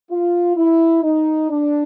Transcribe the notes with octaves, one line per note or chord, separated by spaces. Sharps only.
F4
E4
D#4
D4